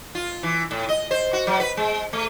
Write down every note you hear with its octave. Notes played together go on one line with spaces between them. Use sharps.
F4
E3
A2
D#5
C5
F#4
F#3
B4
G#3
A3